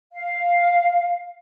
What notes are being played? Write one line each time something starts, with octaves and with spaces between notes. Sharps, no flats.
F5